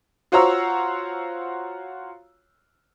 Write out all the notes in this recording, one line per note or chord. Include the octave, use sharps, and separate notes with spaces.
F4 F#4 C5 C#5 A#5 E6